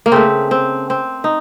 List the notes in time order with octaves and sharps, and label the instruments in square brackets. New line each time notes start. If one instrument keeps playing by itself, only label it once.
[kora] A#3
C#3 A3 C4
C4
C4
D#4